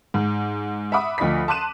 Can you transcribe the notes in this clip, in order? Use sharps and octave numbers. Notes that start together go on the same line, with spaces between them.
G#2
E5 F#5 B5 D6 D#6
D2 F3 D#5 B5 B6
A5 C6 D6 F#6 D#7 E7